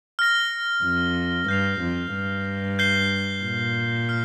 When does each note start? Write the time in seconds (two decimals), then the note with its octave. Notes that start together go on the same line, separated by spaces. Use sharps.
0.19 F6 A#6 G7
0.84 F2
1.48 G2 G6 C7 F7
1.81 F2
2.14 G2
2.79 G6 C7 G7
3.44 A#2
4.09 F6 C7 G7